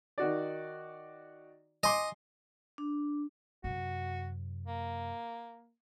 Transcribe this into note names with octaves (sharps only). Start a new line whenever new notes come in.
D#3 F#4 D5
D#5 G#5 C6 D6
D4
F#2 C3 F#4
A#3